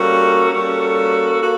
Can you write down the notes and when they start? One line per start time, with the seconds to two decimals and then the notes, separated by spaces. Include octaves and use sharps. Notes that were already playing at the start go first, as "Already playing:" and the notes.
Already playing: G3 A#3 C#4 F#4 A4
0.52 G3 A#3 C#4 F#4 A4
1.42 A#3 F#4 A4